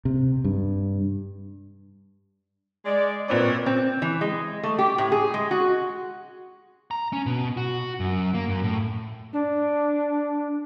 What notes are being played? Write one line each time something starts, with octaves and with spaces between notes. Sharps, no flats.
C3
G2
G#3 D5
A#2 B3 C4 B4 C#5 D5
C4
E3
G#3
A3
G4
A2
G#4
G#3
F#4
A#5
C#4
B2
F#4
F#2
A#3
F#2
A2
D4